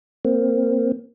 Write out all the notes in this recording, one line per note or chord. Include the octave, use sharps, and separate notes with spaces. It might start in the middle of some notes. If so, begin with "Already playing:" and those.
A#3 C4